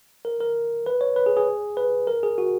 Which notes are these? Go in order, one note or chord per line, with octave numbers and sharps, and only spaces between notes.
A#4
A#4
B4
C#5
B4
G#4
G#4
B4
A#4
G#4
F#4